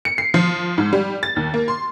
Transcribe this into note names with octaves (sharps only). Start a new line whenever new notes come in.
C#7
C7
F3
G#2
G3
A6
D#2
A#3
C6